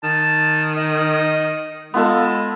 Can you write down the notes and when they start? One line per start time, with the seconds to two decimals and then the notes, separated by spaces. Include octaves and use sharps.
0.04 D#3 A5
0.77 D#5
1.94 G#3 B3 F4 A4